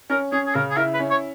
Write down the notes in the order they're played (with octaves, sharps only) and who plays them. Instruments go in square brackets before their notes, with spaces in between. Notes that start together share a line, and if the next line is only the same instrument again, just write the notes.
[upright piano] C#4 [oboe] A#4
[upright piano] C#4 [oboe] G#4
[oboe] G#4
[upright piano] C#3 [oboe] A#4
[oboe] G#4
[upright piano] E4 [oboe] A#4
[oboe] B4
[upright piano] C#4
[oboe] C#5